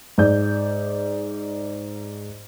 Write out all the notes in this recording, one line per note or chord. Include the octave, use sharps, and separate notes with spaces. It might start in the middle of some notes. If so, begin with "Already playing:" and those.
G#2 D5 G6